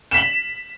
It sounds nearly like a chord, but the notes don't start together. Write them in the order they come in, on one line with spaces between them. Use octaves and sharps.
E7 B6 F#7